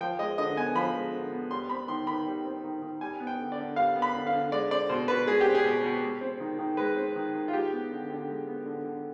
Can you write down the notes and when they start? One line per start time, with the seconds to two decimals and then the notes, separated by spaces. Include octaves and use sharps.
0.01 F3 G5
0.19 G#3 D#5
0.38 D3 D#5
0.56 B3 G#5
0.75 F3 B5
0.95 G#3
1.13 D3
1.33 B3
1.51 G3 C6
1.69 C4 B5
1.88 D#3 C6
2.07 D#3 B5
2.26 G3
2.45 C4
2.64 D#3
2.82 D#3
3.01 G3 G#5
3.20 B3
3.27 G5
3.39 D3
3.52 D5
3.58 D3
3.76 G3 F5
3.96 B3
4.02 B5
4.14 D3
4.27 F5
4.33 D3
4.52 G#3 D5
4.71 C4 D5
4.89 B2 C5
5.08 B2 B4
5.27 G#3 G#4
5.41 G4
5.46 C4
5.55 G#4
5.64 B2
5.83 B2
6.02 G#3
6.21 C4
6.40 D#3
6.59 D#3
6.77 G#3 B4
6.96 C4
7.16 D#3
7.34 D#3
7.48 F4
7.53 G#3 G4
7.72 B3
7.91 D3
8.10 D3
8.28 G#3
8.47 B3
8.66 D3
8.84 D3